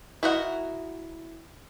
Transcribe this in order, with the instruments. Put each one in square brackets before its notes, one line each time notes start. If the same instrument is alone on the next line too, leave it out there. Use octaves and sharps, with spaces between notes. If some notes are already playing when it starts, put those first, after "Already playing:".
[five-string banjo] E4 F#4 A#4 D#5 F#5